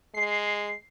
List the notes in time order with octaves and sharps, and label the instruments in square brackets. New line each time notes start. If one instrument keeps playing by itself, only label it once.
[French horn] G#3 [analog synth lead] C7